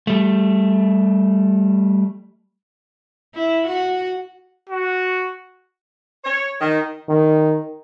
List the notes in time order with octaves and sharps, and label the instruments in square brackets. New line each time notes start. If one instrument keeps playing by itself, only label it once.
[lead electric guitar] G3 A3
[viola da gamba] E4
F#4
[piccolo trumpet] F#4
[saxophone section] C#5
D#3
[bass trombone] D#3